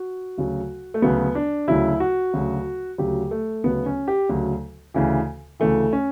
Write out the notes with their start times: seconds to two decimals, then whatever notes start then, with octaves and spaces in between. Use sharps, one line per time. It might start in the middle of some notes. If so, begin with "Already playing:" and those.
Already playing: F#4
0.37 D2 C#3 F#3
0.94 A3
1.02 D2 C#3 F#3 B3
1.35 D4
1.68 D2 C#3 F#3 E4
2.00 F#4
2.34 D2 C#3 F#3
2.98 D2 C#3 F#3 G4
3.31 A3
3.64 D2 C#3 F#3 B3
3.86 C#4
4.08 G4
4.29 D2 C#3 F#3
4.94 D2 C#3 E3
5.60 D2 C#3 E3 A3
5.93 C#4